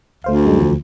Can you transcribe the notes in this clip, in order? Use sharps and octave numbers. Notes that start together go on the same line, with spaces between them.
D2 A3 C5 F5
F#2 G3 G#3
E2 D3 F3